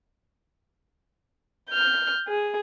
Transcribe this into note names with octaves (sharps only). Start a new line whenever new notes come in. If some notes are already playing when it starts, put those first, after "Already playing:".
F6 G6
G#4